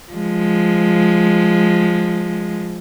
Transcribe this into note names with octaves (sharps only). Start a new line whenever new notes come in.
F3 G#3